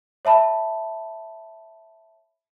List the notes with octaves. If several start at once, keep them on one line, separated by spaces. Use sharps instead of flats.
C#5 E5 A5 B5